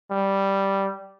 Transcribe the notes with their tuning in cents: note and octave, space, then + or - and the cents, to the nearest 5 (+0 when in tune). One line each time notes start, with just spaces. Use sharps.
G3 -5